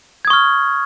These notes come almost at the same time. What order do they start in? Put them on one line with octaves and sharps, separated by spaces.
G#6 D#6 C#6 F6